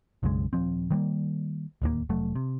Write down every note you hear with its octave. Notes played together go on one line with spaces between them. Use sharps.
B1 F#2 C#3 G#3
D#1 C#2 F3 C4
D#3 G3 G#3 A#3
D1 D#2 E3 A#3
F1 F#3 A3
C3